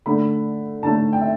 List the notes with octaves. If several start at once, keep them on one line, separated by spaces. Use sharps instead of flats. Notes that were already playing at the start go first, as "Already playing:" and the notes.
D3 A3 B5
D3 A3 A5
G5
E5